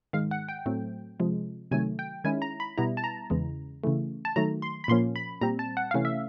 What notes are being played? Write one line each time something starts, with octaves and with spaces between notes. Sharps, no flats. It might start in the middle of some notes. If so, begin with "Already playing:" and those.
G#2 D#3 G#3 F5
F#5
G5
A2 F#3 A3 C4
C3 F3 G#3
C3 D#3 F#3 A3 G#5
G5
D#3 G#3 C#4 E4 G#5
A#5
B5
B2 G3 B3 E4 A#5
A5
A#5
E2 C#3 E3 G#3
C#3 E3 A3
A5
D#3 F#3 A3 A#5
C6
B5
A#2 F3 A#3 C#4 C6
B5
A#2 G3 C4 A#5
A5
F#5
C3 E3 A3 C#4 F5
E5